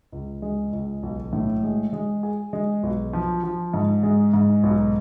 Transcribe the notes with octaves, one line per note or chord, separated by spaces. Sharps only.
C#2
G#3
C#2
B1
A2
G#3
G#3
G#4
G#3
B1
F3
F3
G#2
G#3
G#2
B1